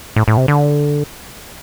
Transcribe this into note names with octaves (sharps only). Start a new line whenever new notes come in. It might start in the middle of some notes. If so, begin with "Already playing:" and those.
A2
A2
C3
D3